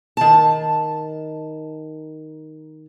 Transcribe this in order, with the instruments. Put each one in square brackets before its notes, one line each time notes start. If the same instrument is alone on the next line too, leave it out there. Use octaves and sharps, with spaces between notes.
[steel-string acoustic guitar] D#3 A5